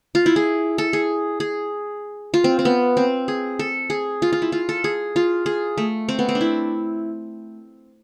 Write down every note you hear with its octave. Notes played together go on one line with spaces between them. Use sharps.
F4
E4
G#4
A4
G#4
G#4
F4
C4
C4
B3
C4
G#4
A4
G#4
F4
F4
E4
F4
A4
G#4
F4
G#4
A3
C4
B3
C4
D4
E4